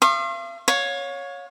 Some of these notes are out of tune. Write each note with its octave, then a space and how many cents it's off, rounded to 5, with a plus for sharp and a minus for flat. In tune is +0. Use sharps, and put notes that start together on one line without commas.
F5 -40 C6 +45 D#6 -45
C#5 +0 F5 +35